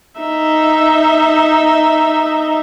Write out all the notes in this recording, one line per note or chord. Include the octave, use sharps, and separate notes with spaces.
D#4 E5